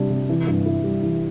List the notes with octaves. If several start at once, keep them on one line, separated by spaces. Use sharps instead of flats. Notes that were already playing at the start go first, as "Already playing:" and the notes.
Already playing: C3 G3 D4 G4
C3
E3
G2
E4
G3
E3